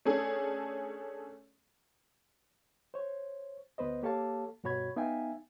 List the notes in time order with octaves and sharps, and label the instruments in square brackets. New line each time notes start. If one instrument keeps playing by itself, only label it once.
[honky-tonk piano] A3 C#4 D4 G#4 A4
[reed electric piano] C5 C#5
D2 B3 B4 C5 D#5
A#3 G4 A4 C#5 F5 A5
G2 B2 F#4 C#5 B5 G#6
B3 D#4 E5 F5 G5 G#5